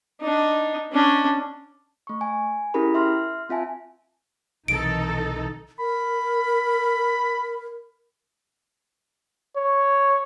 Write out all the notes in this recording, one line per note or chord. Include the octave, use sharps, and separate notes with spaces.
D4 D#4
C#4 D4
A3 C#6
G#5
C#4 E4 G4 G#4 A#4 B5
E5 C6 F6
C4 F4 E5 G#5 A5
B1 C3 D#3 E3 D#4 A4 D7
A#4 B5
C#5